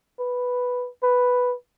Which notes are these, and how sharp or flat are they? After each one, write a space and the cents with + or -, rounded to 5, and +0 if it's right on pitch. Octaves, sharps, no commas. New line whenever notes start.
B4 +0
B4 +0